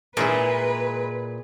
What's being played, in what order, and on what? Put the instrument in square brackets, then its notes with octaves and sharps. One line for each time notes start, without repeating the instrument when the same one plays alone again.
[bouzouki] A#2 [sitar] G#3 [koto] E4 G#4 A#4 [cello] B4